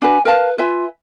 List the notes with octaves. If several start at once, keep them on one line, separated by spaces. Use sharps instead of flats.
D4 F#4 B4 G#5
A#4 B4 F5 A5
F4 B4 E5 G#5